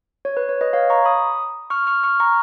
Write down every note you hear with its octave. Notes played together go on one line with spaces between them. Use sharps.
C#5
B4
C#5
B4 D#5
C#5 F5
A#5 C#6
B5 D#6
C#6 F6
C#6 F6
C#6 F6
A#5 C#6